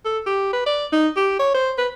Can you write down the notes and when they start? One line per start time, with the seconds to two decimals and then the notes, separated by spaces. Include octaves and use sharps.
0.05 A4
0.26 G4
0.53 B4
0.66 D5
0.92 D#4
1.17 G4
1.39 C#5
1.54 C5
1.78 B4